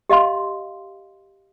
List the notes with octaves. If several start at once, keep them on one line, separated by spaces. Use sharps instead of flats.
G4 D#5 F5 C6